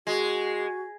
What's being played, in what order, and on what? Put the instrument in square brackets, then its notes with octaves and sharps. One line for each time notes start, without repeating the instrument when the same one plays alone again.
[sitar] G#3 [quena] F#4